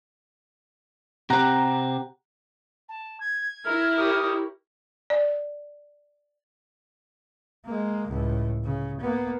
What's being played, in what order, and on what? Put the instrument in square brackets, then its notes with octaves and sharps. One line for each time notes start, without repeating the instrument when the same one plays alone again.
[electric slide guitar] C3 C4 [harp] G4 F#5 A#5
[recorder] A5
G#6
[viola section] E4 A#4 [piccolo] F6
[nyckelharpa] G4 C#5 [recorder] D#6
[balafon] D5
[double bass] G#3 A#3
C#2 A2
C#3
A#3 B3